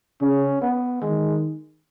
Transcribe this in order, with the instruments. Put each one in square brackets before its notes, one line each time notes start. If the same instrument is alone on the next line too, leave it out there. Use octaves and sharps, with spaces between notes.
[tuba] C#3 [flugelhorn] C#4
[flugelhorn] B3
[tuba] D#3 [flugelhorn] G#3